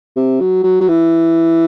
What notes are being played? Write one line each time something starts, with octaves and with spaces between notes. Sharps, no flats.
C3
F#3
F#3
F#3
E3